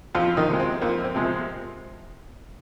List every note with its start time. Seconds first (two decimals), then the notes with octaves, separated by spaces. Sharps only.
0.15 F2 F3 F4
0.37 D#3 D#4
0.48 C3 F3 G#3
0.60 C4
0.82 F2 A#3
1.04 C4
1.15 C3 F3 G#3